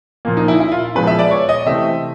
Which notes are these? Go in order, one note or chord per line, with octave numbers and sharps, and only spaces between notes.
A#2 F3 A#3
D#4
E4
E4
F4
A#2 F3 G#3 B3 B4
E5
D5
C#5
D#5
C3 E3 A3 C4 E5